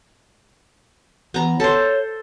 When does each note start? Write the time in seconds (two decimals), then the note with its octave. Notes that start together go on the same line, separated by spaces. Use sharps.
1.34 E3 B3 A#5
1.60 A4 C5 C#5